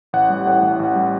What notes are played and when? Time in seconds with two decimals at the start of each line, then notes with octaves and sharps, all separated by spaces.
0.13 A1 F#5
0.30 G3
0.46 A2
0.62 A1
0.80 A1
0.96 G3